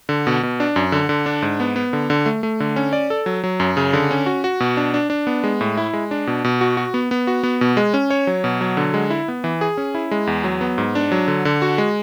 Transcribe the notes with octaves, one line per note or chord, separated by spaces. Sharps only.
D3
B2
B2
D4
F#2
D3
D3
D4
G#2
B3
B3
D3
D3
A3
A3
D3
C#4
D5
A4
F#3
F#3
F#2
C#3
D3
C#4
F#4
F#4
B2
D4
D4
D4
B3
G#3
A2
E4
G#3
D4
B2
B2
F#4
F#4
B3
B3
F#4
B3
B2
G#3
C#4
C#5
F#3
B2
F#3
D3
G#3
E4
B3
E3
G#4
C#4
E4
G#3
E2
F#3
B3
G#2
D4
F#3
D3
D3
F#4
G#3